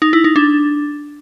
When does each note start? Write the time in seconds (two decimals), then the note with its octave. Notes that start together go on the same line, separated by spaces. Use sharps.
0.02 D#4
0.13 E4
0.24 D#4
0.36 D4